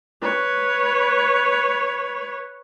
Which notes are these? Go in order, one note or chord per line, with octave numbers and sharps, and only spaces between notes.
B4 C#5